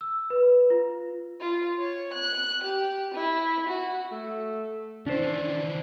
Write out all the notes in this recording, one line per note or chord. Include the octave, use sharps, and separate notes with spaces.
E6
B4
F4
F4
C#5
F#6
G4
E4
F#4
A3
D#3 E3 C#4 D4 C5